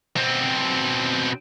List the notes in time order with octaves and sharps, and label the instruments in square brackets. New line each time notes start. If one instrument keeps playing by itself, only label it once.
[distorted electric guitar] B2 C4